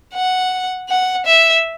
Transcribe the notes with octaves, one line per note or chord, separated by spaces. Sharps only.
F#5
F#5
E5